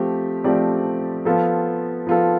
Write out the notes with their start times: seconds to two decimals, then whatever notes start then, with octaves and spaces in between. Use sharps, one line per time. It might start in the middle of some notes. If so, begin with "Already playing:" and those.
Already playing: F3 A3 C4 G4
0.44 F3 A3 C4 G4 D5
1.25 F3 B3 F4 A4
2.07 F3 B3 F4 A4